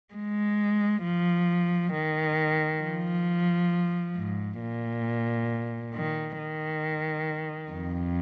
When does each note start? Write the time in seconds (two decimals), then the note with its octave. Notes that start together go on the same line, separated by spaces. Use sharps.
0.14 G#3
1.03 F3
1.94 D#3
2.82 F3
4.16 G#2
4.60 A#2
5.95 D#3
6.39 D#3
7.72 F2